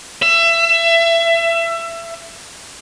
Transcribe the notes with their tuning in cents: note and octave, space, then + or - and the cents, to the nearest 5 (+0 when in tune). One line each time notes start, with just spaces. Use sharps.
E5 +25